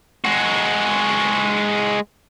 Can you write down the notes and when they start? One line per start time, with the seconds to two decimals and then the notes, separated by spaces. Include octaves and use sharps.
0.25 G#3 F#4